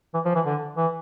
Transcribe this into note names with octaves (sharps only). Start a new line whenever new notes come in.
E3
F3
E3
D3
E3